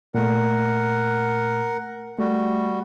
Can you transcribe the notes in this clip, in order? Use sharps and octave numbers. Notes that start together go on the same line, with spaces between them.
A#2 A3 A#4 F#5
G3 A3 F#4